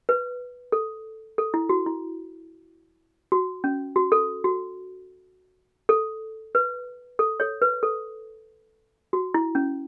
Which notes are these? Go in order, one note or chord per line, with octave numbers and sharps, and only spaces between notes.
B4
A4
A4
E4
F#4
E4
F#4
C#4
F#4
A4
F#4
A4
B4
A4
A4 C#5
B4
A4
F#4
E4
C#4